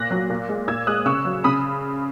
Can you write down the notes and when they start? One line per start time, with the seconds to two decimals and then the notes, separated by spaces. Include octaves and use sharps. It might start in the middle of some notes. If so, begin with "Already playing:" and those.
Already playing: A#2 F#6 A#6
0.11 F#3
0.30 A#2
0.49 G#3
0.68 A#2 E6 G#6
0.87 G#3 D#6 F#6
1.06 C#3 C#6 E6
1.25 F#3
1.44 C#3 B5 D#6